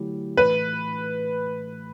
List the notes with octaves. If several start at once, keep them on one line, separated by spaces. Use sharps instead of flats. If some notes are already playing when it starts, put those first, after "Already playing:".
Already playing: D3 F#3 A3 E4 G4
A2 E3 A3 B4